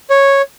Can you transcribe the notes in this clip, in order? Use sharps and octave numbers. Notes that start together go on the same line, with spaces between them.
C#5